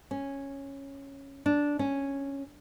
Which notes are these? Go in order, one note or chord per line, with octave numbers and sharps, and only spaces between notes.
C#4
D4
C#4